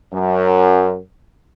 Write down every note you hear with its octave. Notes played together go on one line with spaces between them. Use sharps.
F#2